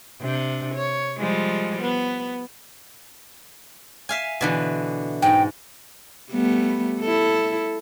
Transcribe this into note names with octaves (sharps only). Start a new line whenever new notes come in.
C3 D4
C#5
F3 G3 G#3
B3
E5 F5 G#5
B2 D3 E3
G#2 G5
G3 A3 B3
E4 A4